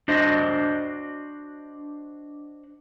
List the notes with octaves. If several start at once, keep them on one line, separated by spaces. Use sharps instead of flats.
D4 F#4 C5 D#5